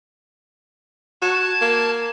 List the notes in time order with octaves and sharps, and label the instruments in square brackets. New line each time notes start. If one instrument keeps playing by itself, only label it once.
[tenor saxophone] F#4 [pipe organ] A5 G#6
[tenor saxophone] A#3